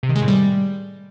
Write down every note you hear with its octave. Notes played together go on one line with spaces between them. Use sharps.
C3
D#3
G#3
A2
G3